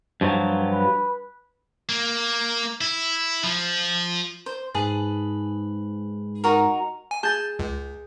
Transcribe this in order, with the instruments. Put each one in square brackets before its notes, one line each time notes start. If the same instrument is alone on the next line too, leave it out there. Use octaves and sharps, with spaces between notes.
[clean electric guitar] G2 F3 F#3
[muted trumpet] B4
[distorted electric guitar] A#3
E4
F3
[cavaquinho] C5
[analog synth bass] G#2 [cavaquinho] G#4 B4 A5
[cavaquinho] D#4 F#4 A#4
[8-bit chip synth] G#5
[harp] G#4 G6 [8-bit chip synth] A5 A6
[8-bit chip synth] C#2